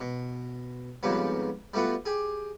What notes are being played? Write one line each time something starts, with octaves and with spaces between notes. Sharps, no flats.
B2
F2 G#2 C#3 G3 B3
G3 A3 B3 F4 F#4
G4 G#4